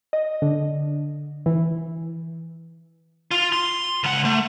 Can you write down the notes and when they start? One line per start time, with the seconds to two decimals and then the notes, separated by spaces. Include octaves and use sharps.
0.13 D#5
0.42 D3
1.46 E3
3.31 F4
3.52 C6
4.04 C#2 F#5
4.25 A3